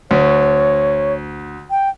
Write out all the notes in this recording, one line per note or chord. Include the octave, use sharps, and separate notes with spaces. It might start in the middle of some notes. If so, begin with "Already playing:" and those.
D2 C#5
G5